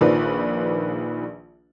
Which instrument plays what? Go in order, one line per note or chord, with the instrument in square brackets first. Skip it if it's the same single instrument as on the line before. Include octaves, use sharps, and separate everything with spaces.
[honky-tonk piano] A#1 D#3 F3 B4 D5